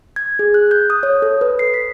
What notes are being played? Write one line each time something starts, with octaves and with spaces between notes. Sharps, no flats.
G#6
G#4
F#6
G6
D#6
C#5
A4
B4
C7
B6